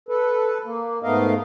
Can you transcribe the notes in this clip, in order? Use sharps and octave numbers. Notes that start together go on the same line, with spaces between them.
A4 B4
A#3
G#2 A3 B3 A#4 D#5 F5